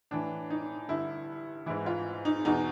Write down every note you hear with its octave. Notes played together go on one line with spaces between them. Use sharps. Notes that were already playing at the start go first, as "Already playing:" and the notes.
A2 E3 D4
D#4
G2 D3 E4
G#2 E3 E4
F4
D#4
E2 B2 D#4